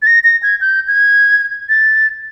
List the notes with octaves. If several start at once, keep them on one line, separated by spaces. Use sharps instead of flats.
A6
A#6
A#6
G#6
G6
G#6
A6